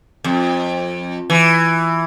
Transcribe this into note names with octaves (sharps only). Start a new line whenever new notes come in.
F2
E3